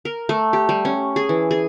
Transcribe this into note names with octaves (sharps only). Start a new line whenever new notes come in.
A#4
A3
G4
G3
C#4
G#4
E3
G#4